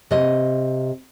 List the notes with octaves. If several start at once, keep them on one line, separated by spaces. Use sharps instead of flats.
C3 D#5